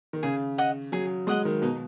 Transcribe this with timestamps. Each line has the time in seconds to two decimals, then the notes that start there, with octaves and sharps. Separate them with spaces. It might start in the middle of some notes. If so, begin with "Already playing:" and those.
0.13 D#3
0.23 C#3 G#4
0.58 D#5 F#5 D#6
0.92 F#3 G#4
1.27 G#3 D#5 F#5 D#6
1.45 D#3
1.62 B2 D#4